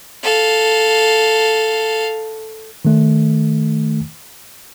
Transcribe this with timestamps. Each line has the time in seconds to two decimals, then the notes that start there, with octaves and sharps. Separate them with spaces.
0.23 A4 F5
2.85 D#3 A3